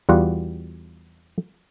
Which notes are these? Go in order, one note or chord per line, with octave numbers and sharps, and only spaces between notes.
E2 G3 F4 F#4 F#5